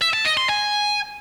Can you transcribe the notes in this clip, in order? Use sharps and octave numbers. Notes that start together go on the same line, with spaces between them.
E5
A5
D#5
C6
G#5